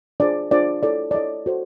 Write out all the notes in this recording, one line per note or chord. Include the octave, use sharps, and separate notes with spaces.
D4 F4 G#4 C5 D5
D4 F4 G#4 C5 D5
E4 A4 C#5 D5
D5
E4 A4 C#5 D#5
F#4 A4 C5